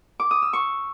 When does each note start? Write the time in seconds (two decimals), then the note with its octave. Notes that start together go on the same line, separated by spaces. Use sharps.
0.20 D6
0.31 D#6
0.42 E6
0.53 C#6